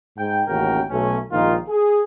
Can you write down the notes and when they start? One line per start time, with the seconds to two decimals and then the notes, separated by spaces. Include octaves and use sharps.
0.18 G#2 G5
0.48 A1 D#2 C#3 F#4 A#4 G5
0.90 B1 A3 C#4
1.32 A#1 G#2 D#3 D#4 F4
1.69 G#4